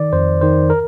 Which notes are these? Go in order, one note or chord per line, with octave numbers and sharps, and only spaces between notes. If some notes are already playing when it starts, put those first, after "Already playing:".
Already playing: D#3 D5
F2 C5
D#3 C5
A#4